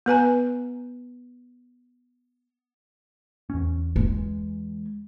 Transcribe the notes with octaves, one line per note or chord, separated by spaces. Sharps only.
B3 B4 G#5 A#5
E2 C#4
E3 G#3